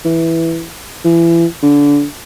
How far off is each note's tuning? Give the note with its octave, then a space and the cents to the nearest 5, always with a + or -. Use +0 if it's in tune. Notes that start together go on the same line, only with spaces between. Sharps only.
E3 +0
E3 +30
D3 -25